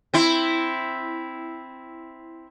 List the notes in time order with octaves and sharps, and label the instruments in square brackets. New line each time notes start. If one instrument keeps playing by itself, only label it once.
[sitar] C4 E4